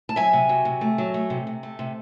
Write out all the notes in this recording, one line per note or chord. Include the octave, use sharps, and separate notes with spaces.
A5
F#3 E5 G#5
C3
F#3
C3
A3
F#3
A3
C3
C3
A3
C3